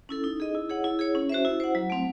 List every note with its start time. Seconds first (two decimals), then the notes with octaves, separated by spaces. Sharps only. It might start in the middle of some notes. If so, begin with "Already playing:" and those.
0.09 C#4 E4 A4
0.24 D#4
0.40 G#4 D#5
0.55 E4
0.70 G#4 C#5 F#5
0.84 E4
0.99 G#4 C#5
1.15 C#4
1.29 F#4 C5 E5
1.45 E4
1.60 C5 F#5
1.75 F#3
1.90 A3 C4